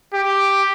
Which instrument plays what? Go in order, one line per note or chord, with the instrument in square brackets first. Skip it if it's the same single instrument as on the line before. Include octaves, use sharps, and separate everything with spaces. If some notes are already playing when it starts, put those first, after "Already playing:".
[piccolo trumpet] G4